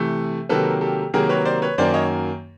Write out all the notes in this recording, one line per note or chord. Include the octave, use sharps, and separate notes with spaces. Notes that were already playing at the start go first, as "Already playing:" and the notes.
Already playing: C3 E3 A3
C3 D#3 F#3 A#3 A4 B4
G4 A4
C3 D#3 F#3 A#3 G#4 A#4
B4 C#5
C5 D5
B4 C#5
F#2 D#3 F#3 A#3 C5 D5
C#5 D#5